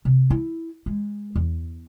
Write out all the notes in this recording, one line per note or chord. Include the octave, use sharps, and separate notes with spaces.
C3
E4
G#3
E2